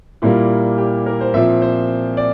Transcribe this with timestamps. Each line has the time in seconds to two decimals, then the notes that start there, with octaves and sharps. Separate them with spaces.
0.22 A#2 G3 A#3 E4
0.78 G4
1.06 A#4
1.21 C5
1.34 A#2 F3 C4 E5
1.62 C5
2.17 D5